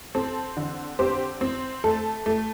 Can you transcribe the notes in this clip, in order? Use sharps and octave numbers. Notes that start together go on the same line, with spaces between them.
C4 A4
D3
C4 G4 C5
C4
A3 A4
A3